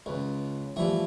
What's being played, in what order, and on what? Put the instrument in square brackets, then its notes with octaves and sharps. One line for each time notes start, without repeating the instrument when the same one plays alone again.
[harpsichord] C#2 [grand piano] B4
[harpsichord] E3 A3 [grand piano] F3 G3